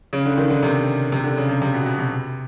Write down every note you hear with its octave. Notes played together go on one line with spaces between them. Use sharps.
C#3
D3
D#3
D3
C3
C3
D3
C#3
C3
C3
B2
B2
C3